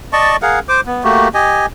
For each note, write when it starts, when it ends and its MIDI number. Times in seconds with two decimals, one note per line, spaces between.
0.13 0.36 74
0.13 0.36 75
0.13 0.36 81
0.13 0.36 85
0.42 0.59 68
0.42 0.59 70
0.42 0.59 77
0.42 0.59 78
0.69 0.81 72
0.69 0.81 86
0.86 1.04 59
1.04 1.28 57
1.04 1.28 58
1.04 1.28 66
1.04 1.28 67
1.34 1.66 67
1.34 1.66 75
1.34 1.66 80